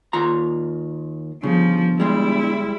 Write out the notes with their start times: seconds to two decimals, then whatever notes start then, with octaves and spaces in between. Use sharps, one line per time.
0.13 D#2 F4 A#5
1.43 G1 C#3 F3
2.00 G3 G#3 E4